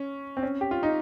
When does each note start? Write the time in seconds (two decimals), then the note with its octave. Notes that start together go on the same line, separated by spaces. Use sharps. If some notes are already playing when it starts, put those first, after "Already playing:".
Already playing: C#4
0.37 C4
0.43 C#4
0.61 G4
0.71 F4
0.83 D#4